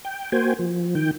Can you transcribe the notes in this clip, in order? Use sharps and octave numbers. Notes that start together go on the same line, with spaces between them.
G5
A#3 F#4 C5 G5 G#5
F3
D#3 G5